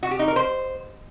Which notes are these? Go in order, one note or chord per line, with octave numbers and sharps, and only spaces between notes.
F#4
G4
D#4
A#4
C5